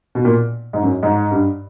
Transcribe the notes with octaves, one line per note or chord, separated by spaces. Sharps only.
B2
A#2
G#2
F#2
G#2
G2